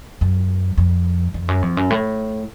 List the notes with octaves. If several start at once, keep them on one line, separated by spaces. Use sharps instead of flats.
F#2
F2
F2
F#2
F2
F#2
A2